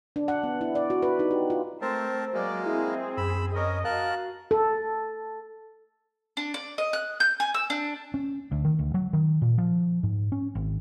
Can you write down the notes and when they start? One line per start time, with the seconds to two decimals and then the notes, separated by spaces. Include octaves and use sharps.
0.16 D4
0.28 F#5
0.43 B3
0.61 E4
0.75 D5
0.90 F#4
1.03 B4
1.19 D#4
1.31 G4
1.50 F4
1.82 A3 C4 A#4 C5 A5
2.34 F#3 G#3 A#3 D5
2.66 C4 E4 G#4
3.17 F#2 B5 E6
3.55 C#4 A#4 D#5
3.85 F#4 A#4 F5 A5 F#6
4.51 A4
6.37 D4
6.54 D5
6.78 D#5
6.93 F#6
7.20 G6
7.40 G#5
7.54 E6
7.70 D4
8.14 C#4
8.52 D2
8.65 D#3
8.79 D2
8.94 F#3
9.13 D#3
9.42 A#2
9.58 F3
10.03 G#2
10.32 C#4
10.55 G#1